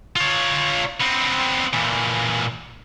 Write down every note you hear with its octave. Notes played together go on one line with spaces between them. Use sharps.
F4 C#5
B3 C4
A#2 E3